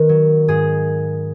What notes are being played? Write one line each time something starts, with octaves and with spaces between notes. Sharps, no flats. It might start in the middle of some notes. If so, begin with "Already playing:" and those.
Already playing: D#3 B3 A#4
F#3
G#2 G#4